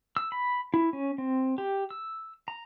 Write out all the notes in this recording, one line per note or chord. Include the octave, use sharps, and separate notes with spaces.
E6
B5
E4
C#4
C4
G4
E6
A#5